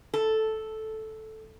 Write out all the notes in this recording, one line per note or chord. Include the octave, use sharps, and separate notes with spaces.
A4